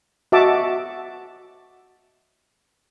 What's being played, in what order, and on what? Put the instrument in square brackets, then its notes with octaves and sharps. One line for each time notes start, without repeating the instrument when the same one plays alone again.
[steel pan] F#4 D#5 E5 F#5 A5 D6